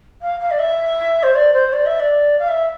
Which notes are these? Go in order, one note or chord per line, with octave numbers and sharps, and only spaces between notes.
F5
F5
D5
E5
C5
D5
C5
D5
E5
D5
F5
E5